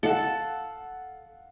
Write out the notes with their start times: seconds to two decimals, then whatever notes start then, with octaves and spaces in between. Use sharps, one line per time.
0.03 A4 F5 F#5